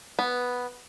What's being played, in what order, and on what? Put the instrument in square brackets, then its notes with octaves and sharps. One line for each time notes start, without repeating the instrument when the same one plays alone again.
[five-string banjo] B3